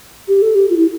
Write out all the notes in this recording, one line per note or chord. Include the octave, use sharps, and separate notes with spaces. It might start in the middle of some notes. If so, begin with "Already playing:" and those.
G4
A4
G4
F4
E4